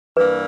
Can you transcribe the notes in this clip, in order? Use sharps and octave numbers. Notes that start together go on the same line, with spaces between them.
G2 E3 G3 A#3 B4